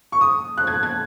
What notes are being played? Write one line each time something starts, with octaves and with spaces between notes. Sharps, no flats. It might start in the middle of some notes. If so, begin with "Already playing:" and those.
C#6
D#6
F#6
G#6
G#6